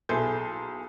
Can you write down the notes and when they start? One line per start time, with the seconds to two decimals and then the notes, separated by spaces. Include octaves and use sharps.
0.09 B1 E4 G#4 A4 C6 G6